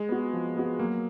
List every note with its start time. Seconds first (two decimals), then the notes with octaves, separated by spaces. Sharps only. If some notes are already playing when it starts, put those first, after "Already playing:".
Already playing: G#3
0.09 B3 F#4
0.33 F3
0.56 B3 F#4
0.79 F#3 A#3